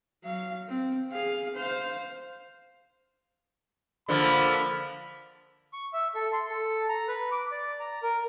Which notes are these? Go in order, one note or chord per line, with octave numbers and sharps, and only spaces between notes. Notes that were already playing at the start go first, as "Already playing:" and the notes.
F#3 F5
C4
G#4 F5
C5 F5
D3 F3 A#3 B5
C#6
E5
A4
C6
A4
A#5
B4
D6
D5
A#5
A#4